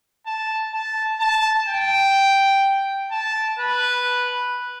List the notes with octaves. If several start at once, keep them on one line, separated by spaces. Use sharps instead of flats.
A5
A5
A5
G5
A5
B4